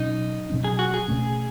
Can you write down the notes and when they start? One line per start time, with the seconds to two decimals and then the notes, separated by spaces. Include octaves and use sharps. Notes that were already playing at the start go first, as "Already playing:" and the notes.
Already playing: B2 F#3 C#4 D#4
0.50 B2 F#3 C#4
0.64 G#4
0.79 F#4
0.94 G#4
1.08 B2 A3 C#4